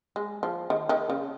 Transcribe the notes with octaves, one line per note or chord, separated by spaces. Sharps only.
G#3
F3
D#3
D#3
C#3